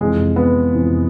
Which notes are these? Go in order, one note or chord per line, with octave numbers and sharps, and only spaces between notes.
F2 C3 E3 G#3 G#4
B3 B4
F2 C3 E3